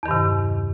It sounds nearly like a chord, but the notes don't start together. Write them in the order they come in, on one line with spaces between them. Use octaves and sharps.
E2 D#3 G2 C3